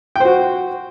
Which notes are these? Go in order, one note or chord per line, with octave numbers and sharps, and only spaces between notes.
F#4 C5 G5